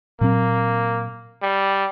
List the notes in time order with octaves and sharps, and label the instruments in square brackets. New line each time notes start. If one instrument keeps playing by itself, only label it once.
[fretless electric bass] A#2 F#3 C4 [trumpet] A#3
[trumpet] G3